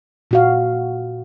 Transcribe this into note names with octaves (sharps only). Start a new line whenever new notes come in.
A#2 F#4 F5